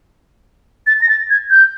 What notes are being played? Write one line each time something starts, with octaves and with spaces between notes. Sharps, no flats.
A6
A#6
A6
G#6
G6